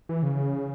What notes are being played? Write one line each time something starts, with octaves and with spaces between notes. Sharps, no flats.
E3
C#3